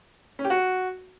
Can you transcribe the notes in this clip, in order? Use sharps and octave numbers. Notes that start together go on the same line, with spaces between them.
C#4
G4
F#4